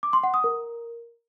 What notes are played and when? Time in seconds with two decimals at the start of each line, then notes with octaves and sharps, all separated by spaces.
0.03 D6
0.13 C6
0.23 F#5
0.34 D#6
0.44 A#4